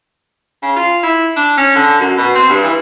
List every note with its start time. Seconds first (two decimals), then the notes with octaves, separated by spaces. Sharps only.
0.63 C#3
0.76 F4
1.03 E4
1.36 D4
1.57 C#4
1.76 D3
2.00 F#2
2.18 B2
2.35 C4
2.50 G2
2.64 E3